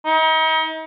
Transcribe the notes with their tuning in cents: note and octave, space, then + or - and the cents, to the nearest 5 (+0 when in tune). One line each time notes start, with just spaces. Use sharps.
D#4 +40